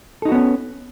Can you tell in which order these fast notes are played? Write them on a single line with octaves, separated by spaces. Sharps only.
A4 D#4 F#4 B3 C#4